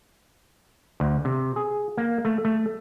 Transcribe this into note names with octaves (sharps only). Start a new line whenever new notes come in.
D2
C3
G#4
A#3
A3
A3